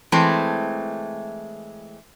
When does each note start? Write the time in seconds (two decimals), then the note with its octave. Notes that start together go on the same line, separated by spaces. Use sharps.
0.12 E3 G#3 A3 C4